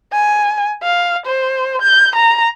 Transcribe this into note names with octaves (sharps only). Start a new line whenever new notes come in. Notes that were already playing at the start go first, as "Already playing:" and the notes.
G#5
F5
C5
G6
A#5